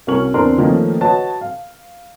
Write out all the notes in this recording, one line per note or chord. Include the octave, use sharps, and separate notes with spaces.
C2 F#3 C#4 A#4 C#6 F#7
E2 C4 D4 A#4 A#5 C6
D#3 F3 A3 A#3 C#4 D#4
F#4 B4 C#5 D#5 A5
F5